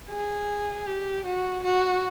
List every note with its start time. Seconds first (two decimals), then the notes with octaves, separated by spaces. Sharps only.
0.10 G#4
0.86 G4
1.25 F#4
1.63 F#4